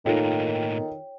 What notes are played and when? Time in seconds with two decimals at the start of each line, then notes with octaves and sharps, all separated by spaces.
0.06 A2 D#3 A#3 D#4 F4 A4 C#5 G5